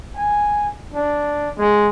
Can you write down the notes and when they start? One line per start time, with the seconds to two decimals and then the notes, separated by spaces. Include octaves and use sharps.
0.15 G#5
0.94 D4
1.58 G#3